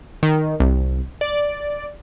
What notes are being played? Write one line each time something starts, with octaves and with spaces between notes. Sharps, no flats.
D#3
C2
D5